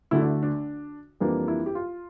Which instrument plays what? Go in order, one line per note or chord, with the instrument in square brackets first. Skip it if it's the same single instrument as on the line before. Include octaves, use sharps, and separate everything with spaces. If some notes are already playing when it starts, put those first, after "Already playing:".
[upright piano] D2 D3 A3 D4 E4
D4
D4
F2 E3 G3 A#3 D4
E4
G4
F4